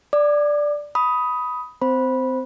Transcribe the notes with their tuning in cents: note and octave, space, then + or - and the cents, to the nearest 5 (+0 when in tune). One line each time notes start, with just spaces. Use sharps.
D5 +0 D6 +35
B5 +0 D#6 +10
C4 -30 C5 +0 B5 -10